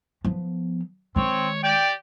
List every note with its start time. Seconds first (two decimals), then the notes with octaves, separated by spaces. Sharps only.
0.24 F3 B3
1.16 D#3 G#3 C4 C#5
1.63 G4 D5 G5